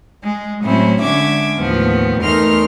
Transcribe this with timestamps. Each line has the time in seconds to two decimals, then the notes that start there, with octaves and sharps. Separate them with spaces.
0.24 G#3
0.64 A2 F#3 C4 C#4 E4
1.02 D3 G#3 C#4 E5 D6 G#6
1.59 D#2 A2 F3 B3
2.22 E2 A3 D#4 A#4 C6 F6